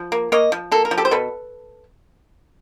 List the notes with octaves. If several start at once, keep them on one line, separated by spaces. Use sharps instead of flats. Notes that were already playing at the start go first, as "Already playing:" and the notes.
Already playing: F3
A#3
A#3 C#5 D#5
F3
A#3 A4
A#4
F3
G4 A4
C5
B2 A4 B4